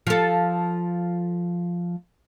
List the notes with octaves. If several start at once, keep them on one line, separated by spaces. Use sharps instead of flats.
F3 A4